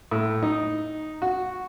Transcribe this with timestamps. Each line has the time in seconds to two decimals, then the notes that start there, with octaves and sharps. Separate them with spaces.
0.11 A2
0.43 D#4
1.22 F#4